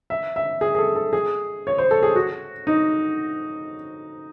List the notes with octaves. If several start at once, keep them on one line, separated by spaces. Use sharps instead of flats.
E5
E5
G#4
G#4
A4
A4
G#4
C#5
C5
A4
G#4
F#4
D#4